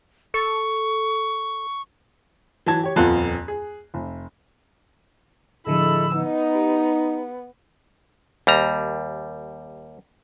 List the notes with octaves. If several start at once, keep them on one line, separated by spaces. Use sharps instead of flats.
A4 C#6
E3 F#3 A5 G#6
G4 C#5
D#1 F2 B3 F4 A4 F#6
G#4
F1
A2 D3 F3 G#3 E4 A4 B5 E6
B3 D#4
G4
D#2 G3 A#5